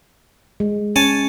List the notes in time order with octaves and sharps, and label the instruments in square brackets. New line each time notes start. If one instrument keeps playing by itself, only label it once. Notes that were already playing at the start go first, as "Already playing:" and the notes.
[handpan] G#3
[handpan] C#4 [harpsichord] C#5 G#5 A5